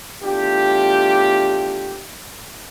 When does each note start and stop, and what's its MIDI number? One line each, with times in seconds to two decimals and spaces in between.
0.24 2.03 40
0.24 2.03 57
0.24 2.03 62
0.24 2.03 65
0.24 2.03 67